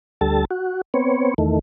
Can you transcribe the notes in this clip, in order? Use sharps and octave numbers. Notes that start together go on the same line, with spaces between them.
D2 G3 A4 A5
F#4
B3 C4 C#5
E2 D#3 A3